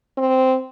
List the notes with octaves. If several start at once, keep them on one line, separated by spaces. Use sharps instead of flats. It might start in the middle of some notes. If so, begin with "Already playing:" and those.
C4